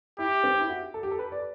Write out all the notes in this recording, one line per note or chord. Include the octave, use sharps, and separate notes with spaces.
E4 G4
C4
E4
F#4
A4
G4
A4
B4
D5